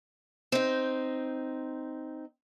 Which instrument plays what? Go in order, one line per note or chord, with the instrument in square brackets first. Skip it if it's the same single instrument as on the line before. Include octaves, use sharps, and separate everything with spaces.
[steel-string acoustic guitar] C4 D#4